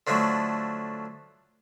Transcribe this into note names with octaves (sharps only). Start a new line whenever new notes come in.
D3 F3 F#3 A3